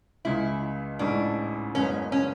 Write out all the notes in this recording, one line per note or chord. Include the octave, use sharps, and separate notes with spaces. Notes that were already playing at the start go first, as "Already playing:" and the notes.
C#2 C#3 G#3 E4
A1 G#2 G#3 C#4 D4 E4
F#1 E2 C#3 G#3 B3 C#4
C#4